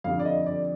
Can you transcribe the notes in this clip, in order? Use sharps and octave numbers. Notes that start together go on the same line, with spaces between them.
F2 D3 G3 F5
D5
D#5
D5